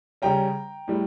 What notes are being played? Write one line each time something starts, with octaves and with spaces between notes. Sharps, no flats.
C#3 G3 C#4 G5 A#5
A2 G3